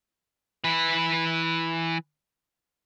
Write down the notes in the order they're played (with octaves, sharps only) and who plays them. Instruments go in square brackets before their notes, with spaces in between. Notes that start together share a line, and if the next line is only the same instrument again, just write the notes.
[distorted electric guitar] E3 B4